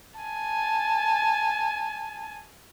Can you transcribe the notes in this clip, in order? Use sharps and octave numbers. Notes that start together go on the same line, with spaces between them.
G#5 A5